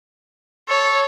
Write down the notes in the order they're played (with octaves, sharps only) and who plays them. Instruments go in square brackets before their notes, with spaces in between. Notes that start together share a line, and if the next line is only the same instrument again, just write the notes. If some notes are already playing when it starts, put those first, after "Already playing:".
[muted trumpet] A4 [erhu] C#5